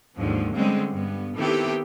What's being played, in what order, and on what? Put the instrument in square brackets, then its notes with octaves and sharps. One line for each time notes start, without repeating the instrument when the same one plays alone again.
[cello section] D#2 G#2 D3 F3
D3 G3 G#3 C4 C#4
G2 B3
D#3 B3 C4 E4 G4 A4